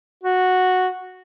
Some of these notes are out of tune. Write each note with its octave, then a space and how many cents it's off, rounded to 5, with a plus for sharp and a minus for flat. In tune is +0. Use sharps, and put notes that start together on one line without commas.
F#4 -5